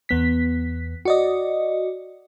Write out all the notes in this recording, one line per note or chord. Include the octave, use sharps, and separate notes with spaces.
E2 B3 B6
F#4 D5 D#5